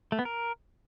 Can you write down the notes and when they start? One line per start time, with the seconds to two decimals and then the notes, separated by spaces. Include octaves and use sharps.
0.12 A3
0.19 B3
0.25 A#4